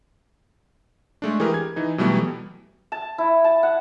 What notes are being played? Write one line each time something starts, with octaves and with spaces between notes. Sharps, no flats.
G#3 A3 D4
E3 G4 G#4 A#4
G#6
E3 D#4
B2 E3 F#3 G3 A3 B3
A5
E4
A5
F#5